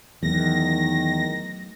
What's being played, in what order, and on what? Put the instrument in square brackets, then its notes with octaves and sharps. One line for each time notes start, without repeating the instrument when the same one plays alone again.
[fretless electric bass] E2 [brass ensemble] D#3 [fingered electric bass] F#3 A3 [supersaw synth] A#6